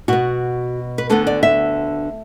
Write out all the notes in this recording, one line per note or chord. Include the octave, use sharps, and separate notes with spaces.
B2 B3 F#4
B4
D2 D3 B3 A4
D5
E5